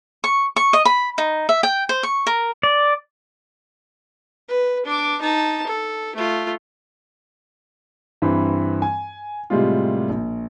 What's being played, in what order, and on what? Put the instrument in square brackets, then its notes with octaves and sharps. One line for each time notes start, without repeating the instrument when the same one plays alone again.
[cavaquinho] C#6
C#6
D#5
B5
D#4
E5
G5
C5
C#6
A#4
[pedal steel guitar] D5
[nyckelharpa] B4
D4 D6
D#4 A5
A4
A3 F4
[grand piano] G2 E3 C4 B5
G#5
A2 C3 G3 G#3 F4
A#1